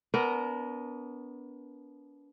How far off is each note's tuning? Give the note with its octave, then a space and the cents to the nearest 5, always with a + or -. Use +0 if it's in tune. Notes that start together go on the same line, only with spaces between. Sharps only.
B3 +0 D4 -40 A#4 +0